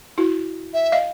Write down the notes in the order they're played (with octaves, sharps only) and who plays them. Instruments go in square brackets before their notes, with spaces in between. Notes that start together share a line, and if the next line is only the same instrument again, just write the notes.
[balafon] E4 F#4
[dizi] E5
[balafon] D#5 F5